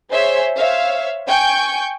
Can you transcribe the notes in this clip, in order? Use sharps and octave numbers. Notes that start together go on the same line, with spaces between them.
G#4 C5 C#5 E5
C5 C#5 E5 F5
G5 G#5 C#6 G6